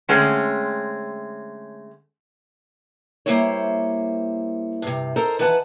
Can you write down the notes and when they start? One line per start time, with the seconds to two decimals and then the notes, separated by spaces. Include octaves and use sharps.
0.09 D3 G#3 A3 C4 C#4
3.26 G3 A#3 E4 C5 C#5
4.82 G2 C3
5.16 A4 A#4 C5 D#5 A#5
5.39 D#3 E3 B4 F#5 G5 A5